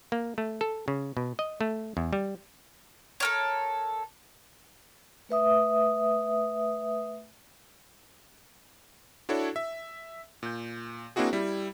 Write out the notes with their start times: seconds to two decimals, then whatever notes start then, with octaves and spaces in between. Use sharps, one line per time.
0.12 A#3
0.38 A3
0.61 A4
0.88 C#3
1.17 B2
1.39 D#5
1.61 A3
1.97 E2
2.13 G3
3.20 A4 A#4 C#5
5.29 A3 B4 E5 D#6
9.29 D4 E4 F#4 A4 C#5
9.56 E5
10.43 A#2 G6
11.16 A#3 C4 D4 E4 F#4 G#4
11.33 G3 E4